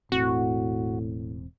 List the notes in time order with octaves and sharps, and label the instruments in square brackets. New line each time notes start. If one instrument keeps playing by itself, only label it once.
[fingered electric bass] E1 C4 [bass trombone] A2 [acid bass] F#4